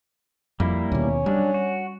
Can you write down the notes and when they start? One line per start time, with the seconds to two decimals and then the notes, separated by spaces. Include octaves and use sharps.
0.60 F2 G3 A#3 E4
0.92 D#2 B2 C#4
1.26 F#3 G3 D4
1.54 F#4